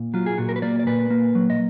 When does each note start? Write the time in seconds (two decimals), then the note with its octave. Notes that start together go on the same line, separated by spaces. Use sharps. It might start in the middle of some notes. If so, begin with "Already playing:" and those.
Already playing: A#2
0.14 F#3 F4
0.26 G#4
0.38 A#2 F#4
0.49 A#4
0.56 B4
0.62 A#3 D5
0.79 D5
0.87 A#2 B4
1.10 A#3
1.35 F#3
1.50 D#5